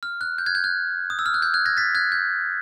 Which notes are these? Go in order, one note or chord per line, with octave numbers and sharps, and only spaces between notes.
F6
F#6
G6
F#6 G#6
G6
F#6
D#6
E6
F6
F#6
G6
F#6 G#6
G#6 A#6
A6 B6
F#6 G#6
G6